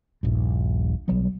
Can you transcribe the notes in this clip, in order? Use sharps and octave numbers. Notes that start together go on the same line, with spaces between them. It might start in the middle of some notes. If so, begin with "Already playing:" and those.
D#1 A#1 G2
B1 F#3 G3 B3